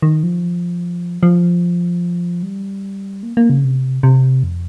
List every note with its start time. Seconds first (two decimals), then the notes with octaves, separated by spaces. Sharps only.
0.02 D#3
0.23 F3
1.23 F3
2.43 G3
3.23 A#3
3.37 A#3
3.50 C#3
3.64 C3
4.03 C3
4.43 F2